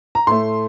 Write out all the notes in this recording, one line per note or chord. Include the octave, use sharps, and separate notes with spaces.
A#5
A2 A3 C6